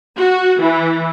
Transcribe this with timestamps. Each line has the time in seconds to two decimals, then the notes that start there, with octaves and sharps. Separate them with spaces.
0.17 F#4
0.61 E3